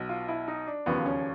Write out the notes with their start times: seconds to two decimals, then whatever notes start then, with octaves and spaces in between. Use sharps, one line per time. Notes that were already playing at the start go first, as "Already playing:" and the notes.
Already playing: B1 B2 F#3
0.09 F4
0.28 E4
0.48 D#4
0.67 D4
0.86 E1 D#2 C#3 F3 B3
1.05 C#4